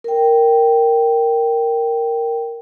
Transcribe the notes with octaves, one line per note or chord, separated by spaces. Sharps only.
A#4 G5